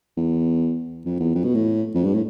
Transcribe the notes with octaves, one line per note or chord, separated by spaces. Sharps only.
E2
F2
E2
F2
B2
A2
F2
G2
A2